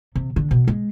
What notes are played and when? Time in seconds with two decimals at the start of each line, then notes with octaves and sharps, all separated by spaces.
0.15 C3
0.36 D3
0.51 B2
0.68 G#3